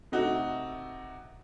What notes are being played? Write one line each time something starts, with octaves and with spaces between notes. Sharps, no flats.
C3 A3 D#4 F#4